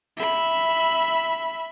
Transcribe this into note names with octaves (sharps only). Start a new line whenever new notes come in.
E5 B5